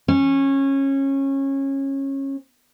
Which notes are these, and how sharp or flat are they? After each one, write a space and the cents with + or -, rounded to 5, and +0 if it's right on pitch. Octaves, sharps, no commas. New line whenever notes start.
C#4 -20